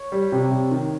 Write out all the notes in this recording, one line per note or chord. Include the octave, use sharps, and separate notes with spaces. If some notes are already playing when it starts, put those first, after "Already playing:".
Already playing: C#5
G3
C3
C3
D#3